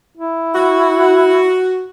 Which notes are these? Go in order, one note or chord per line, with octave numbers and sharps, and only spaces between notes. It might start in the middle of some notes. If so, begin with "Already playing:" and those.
E4
F#4